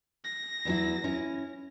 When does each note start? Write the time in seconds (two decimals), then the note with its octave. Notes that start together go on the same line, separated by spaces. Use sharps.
0.24 A#6
0.65 E2 F#3 E4
1.04 C#4 E4